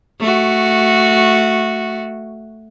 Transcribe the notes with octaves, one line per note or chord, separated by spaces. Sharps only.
A3 F#4